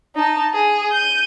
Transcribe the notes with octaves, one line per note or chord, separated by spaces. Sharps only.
D#4 A5
G#4
G6 D#7